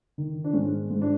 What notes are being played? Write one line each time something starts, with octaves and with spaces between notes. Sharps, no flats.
D#3
D4
G#2 C#4
G#2
D4